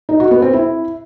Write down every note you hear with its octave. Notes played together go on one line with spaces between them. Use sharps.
D#4
F#4
B3
C4
E4